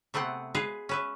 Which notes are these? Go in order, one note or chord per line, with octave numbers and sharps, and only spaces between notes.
C3 A3 B3 C4 F#5
G#3 G#4 B4 F5
C#4 B4 E5